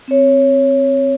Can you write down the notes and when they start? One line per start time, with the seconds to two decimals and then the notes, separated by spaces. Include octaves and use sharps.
0.08 C4 C#5